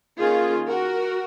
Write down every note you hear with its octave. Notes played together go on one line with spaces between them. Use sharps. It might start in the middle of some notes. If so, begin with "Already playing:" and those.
D#3 A#3 C#4 F4 G#4
F#4 A#4